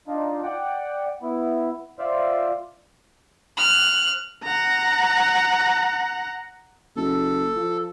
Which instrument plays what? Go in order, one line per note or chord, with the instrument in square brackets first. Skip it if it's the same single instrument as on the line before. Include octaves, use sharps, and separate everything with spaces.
[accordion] D4 D#4 F4
D5 F#5 G5
B3 E4
F4 C5 D5 E5 F5
[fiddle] F6 F#6
[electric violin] F#5 A#5
[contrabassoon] F#1 [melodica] A4
[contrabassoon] F3